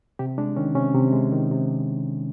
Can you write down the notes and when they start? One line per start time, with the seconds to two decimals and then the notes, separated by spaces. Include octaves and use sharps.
0.19 C3 G4
0.38 G#3 D4
0.56 D#3 C#4
0.75 C3 C#4
0.94 C3
1.13 G#3
1.32 D#3
1.51 C3